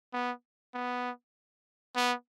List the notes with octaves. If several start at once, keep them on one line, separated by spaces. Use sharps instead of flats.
B3
B3
B3